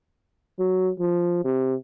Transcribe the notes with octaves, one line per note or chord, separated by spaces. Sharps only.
F#3
F3
C3